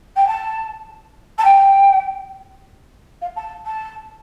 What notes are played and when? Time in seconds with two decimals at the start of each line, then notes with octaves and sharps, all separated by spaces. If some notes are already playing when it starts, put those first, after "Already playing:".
0.16 G5
0.28 A5
1.38 A5
1.45 G5
3.22 F5
3.36 A5
3.66 A5